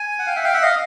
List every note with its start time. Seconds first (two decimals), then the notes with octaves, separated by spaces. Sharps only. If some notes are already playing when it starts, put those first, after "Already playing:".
Already playing: G#5
0.19 F#5
0.27 F5 G5
0.36 E5 F#5
0.44 F5 G5
0.53 E5 F#5
0.62 D#5 F5